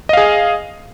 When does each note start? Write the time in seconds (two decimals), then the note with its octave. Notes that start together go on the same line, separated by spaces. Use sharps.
0.09 D#5
0.13 F5
0.17 G#4